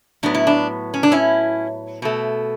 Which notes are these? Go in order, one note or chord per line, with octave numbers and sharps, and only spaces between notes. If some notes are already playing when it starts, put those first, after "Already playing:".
A2 F#3 B3 D4
E4
D4
C#4
D4
C#4 E4
B2 A3